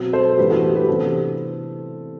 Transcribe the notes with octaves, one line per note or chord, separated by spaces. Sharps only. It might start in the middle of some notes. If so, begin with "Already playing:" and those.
Already playing: B2 F#3 C4
A4 C5
A2 E3 B3 D4 G4 B4
F#4 A4
G4
G4 B4
C3 E3 B3 D4 A4 C5